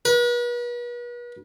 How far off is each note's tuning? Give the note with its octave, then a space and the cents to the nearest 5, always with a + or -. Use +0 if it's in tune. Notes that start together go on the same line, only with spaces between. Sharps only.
B4 -40